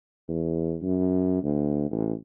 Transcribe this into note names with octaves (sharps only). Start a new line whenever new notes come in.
E2
F#2
D2
A1